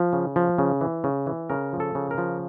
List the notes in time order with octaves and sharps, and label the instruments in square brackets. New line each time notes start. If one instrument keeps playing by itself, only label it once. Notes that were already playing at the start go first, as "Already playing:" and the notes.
Already playing: [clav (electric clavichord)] F3
C#3
F3
C#3
E3
C#3
E3
C#3 A#4
F3
A4
C#3
A#4
F3